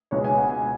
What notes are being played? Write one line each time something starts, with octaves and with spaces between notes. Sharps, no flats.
C#2 B2 G#3 C#5
G#5
F#5
G#5